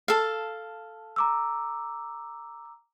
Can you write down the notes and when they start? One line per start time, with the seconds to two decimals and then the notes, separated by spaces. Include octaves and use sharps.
0.08 A4 F5
1.16 A#5 D6 E6